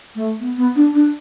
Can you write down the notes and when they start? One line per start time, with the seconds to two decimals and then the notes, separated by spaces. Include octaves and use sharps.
0.15 A3
0.40 B3
0.57 B3
0.76 D4
0.94 D4